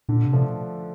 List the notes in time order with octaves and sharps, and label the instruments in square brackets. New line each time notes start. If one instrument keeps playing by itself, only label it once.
[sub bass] A#2 [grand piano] D3
[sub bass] C3
[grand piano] F3 A3 D4